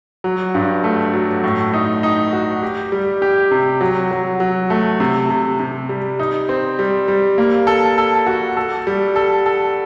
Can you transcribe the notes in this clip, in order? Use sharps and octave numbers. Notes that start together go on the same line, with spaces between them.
F#3
G2
A3
F#3
A2
D#4
D#4
F#4
G4
G3
G4
C3
F#3
F#3
F#3
A3
C3
C3
C3
G3
D#4
C4
G3
G3
A#3
A4
A4
F#4
A4
G3
A4
A4